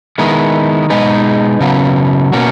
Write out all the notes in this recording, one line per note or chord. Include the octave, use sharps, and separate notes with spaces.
D#3 G#3 B3 E4
B2 G#3 D#4 G#4 B4
C#3 F#3 B3
B2 A#3 C#4 F#4